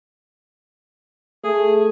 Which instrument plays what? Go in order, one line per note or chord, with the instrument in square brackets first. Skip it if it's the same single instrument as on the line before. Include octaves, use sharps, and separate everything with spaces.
[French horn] A3 [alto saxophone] G#4